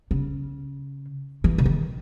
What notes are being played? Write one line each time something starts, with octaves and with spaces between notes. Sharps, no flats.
C#3
E3
C#3
D#3